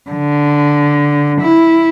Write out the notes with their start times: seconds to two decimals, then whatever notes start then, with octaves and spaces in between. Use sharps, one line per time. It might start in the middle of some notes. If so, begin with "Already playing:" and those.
0.10 D3
1.42 E4